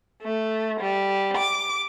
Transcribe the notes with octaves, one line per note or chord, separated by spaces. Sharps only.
A3
G3
D6